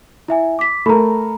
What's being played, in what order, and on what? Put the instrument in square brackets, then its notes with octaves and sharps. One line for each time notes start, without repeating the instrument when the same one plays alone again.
[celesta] E4 E5 G#5
D6 B6
[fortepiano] A3 A#4 [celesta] A#5 B5